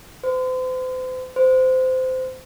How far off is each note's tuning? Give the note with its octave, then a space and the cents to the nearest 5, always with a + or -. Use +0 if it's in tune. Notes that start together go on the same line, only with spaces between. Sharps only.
C5 -40
C5 -20